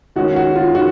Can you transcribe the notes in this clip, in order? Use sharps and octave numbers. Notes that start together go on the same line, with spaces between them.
D#3 G#3 C#4 F#4
F#4
F4
D#3 F#4